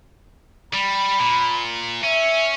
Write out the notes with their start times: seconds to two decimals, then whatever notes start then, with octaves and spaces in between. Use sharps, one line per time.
0.74 G3 B5
1.20 A#2
2.03 C#4 E5